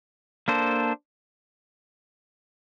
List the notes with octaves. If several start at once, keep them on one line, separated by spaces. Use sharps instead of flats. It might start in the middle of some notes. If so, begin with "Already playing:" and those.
A#3 D4 A4 C5